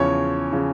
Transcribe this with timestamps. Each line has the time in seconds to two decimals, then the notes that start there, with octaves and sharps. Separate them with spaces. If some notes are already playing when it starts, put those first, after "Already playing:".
Already playing: E2 C#3 F3 C#5
0.53 C#3 F3